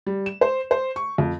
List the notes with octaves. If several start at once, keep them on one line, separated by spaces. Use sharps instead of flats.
G3
E7
C5
C5
C#6
F2